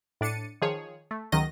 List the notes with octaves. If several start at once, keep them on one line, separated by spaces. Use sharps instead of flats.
A2 D4 A6 C#7 D#7
D#3 F3 G#4 C#5
A3
C#2 D#3 F#3 D#5 A#6